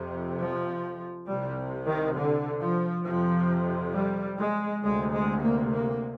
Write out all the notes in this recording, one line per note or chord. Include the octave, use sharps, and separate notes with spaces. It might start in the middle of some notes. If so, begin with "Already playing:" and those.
Already playing: F2 C3
F3
C2 C3 G3
D#3
D3
F3
F2 C3 F3
G3
G#3
D2 C3 G#3
G#3
A#3
A#3